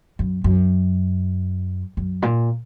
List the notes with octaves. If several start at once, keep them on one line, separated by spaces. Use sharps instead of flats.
F#2
F#2
F#2
A#2